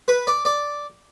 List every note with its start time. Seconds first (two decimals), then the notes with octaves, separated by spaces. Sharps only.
0.08 B4
0.27 D5
0.45 D5